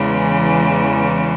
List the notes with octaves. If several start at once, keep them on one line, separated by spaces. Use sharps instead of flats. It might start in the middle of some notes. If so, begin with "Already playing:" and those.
Already playing: E2 C#3 E3 G#3